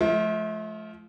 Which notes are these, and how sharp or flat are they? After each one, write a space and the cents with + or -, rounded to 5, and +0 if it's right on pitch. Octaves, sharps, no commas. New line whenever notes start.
F3 +0 A3 -40